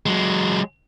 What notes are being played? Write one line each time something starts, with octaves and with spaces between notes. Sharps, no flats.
F#3 G#3